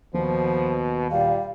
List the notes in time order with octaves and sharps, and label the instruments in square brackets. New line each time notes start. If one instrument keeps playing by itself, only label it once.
[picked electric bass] D#2 [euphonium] B2 [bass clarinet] F3
[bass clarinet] A#2 [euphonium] G3 [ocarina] F5